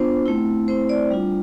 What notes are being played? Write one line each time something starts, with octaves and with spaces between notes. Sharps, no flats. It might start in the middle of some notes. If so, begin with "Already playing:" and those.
Already playing: B3 D4 F4 C5
A3 C4 E4
A3 C4 E4 C5
D5
G3 D4 F4